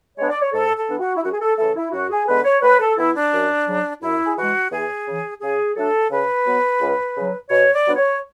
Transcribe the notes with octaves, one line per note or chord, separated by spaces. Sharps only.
G#3 B3 D4 C#5
D5
C#5
G#2 A4
A4
E3 B3 D4
F#4
E4
F#2 F#4
G#4
A4
C#3 E3 A3 A4
E4
F#2 F#4
G#4
D3 G#3 B3 B4
C#5
A2 B4
A4
E3 B3 E4
D4
F#2
C#3 F#3
F#2 E4
G#4
E3 G#3 F#4
E2 G#4
C#3 E3
C#3 G#4
F#3 A3 D4 A4
C#3 B4
F#3 B3
C#2
C#3 F#3
B2 C#5
D5
F#3 B3 D4
C#5